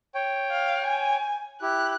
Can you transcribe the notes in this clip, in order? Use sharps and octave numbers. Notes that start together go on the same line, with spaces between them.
C#5 G5
F5
G#5
E4 G4 F#6